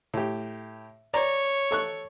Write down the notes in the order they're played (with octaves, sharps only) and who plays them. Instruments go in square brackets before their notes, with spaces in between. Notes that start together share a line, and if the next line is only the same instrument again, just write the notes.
[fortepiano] A2 G4
[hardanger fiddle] C#5 [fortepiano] D5 A#5
[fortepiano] A4 C#6 F#6